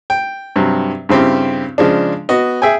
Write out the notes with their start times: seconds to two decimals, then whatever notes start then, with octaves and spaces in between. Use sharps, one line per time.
0.10 G5
0.56 G2 C3 F#3
1.09 G2 C#3 C4 E4 G4
1.78 C#3 F3 G#3 D4
2.29 B3 F#4 D#5
2.62 G#4 E5 G5 G#5